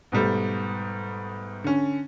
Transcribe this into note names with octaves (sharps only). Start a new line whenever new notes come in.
G#2 B2 G3 A3
D3 C#4